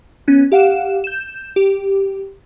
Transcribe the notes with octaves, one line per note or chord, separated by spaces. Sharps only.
B3 C#4
G4 F5 F#5 E7
G6 E7
G4